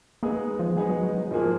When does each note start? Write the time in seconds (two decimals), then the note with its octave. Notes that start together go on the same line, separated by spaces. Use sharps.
0.23 G#3 A#3 B3 D#4 G#4
0.59 F3
0.77 F#3 G#3 B3 D#4 G#4
0.90 F#3
1.03 F#3
1.18 F#3
1.30 G#2 F3 F#3 A#3 F4 G#4